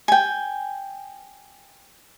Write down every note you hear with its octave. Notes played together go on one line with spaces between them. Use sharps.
G5 G#5